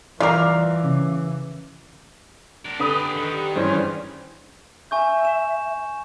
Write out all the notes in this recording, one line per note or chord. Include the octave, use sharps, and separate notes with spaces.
E3 F4 A#4 D5 D6 C7
C#3
D4 A#4
D3 G4 G#4 B4 D#6
D#3
G3
G2 E3 G3 C#4 G#4 C5
E5 G#5 C#6 G6
E7